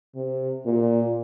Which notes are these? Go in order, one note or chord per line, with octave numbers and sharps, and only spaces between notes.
C3
A#2